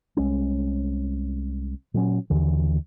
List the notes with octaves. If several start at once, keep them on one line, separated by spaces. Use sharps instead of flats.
C2 G#3 C#4
A#2 F#3 C#4
D#2 D3 E3